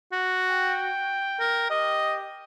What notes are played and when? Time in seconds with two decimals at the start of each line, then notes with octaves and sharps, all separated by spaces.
0.12 F#4
0.50 G5
1.40 A#4
1.70 G4 D#5